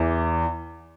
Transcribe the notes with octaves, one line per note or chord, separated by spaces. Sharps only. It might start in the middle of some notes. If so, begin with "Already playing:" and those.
Already playing: E2 E3